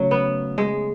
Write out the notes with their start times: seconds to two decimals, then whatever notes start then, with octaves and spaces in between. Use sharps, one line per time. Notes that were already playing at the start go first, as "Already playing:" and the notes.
Already playing: C#3 F#3 A3
0.11 B3
0.58 G#3